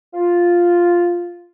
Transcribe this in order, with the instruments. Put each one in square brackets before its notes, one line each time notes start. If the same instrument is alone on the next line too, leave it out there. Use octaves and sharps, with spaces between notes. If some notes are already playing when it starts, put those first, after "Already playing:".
[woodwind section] F4